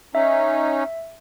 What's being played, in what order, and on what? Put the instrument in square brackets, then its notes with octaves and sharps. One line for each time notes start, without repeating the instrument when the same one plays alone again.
[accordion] C#4 D#4 [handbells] E5